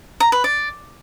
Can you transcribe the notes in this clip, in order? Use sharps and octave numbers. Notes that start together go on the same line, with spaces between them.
A#5
B4
D5